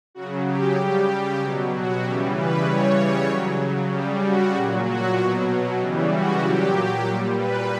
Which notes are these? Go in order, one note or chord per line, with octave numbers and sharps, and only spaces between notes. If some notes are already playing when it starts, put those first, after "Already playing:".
C#3 F#3 F#4
G4
C#3 G3 G4
B2 F#3
F#4
C#3 E3 G3 G4
B4
C#3 E3 G3 C#5
C#3 F#3
C#3 G3 G4
F#4
A#2 F#3
F#4
B2 F#3
C#3 E3 G3
F#4
A#2 F#3 G4
A#2 G3
B4